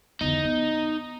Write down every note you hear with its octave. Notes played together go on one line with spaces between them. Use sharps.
E2 D3 D#4
B3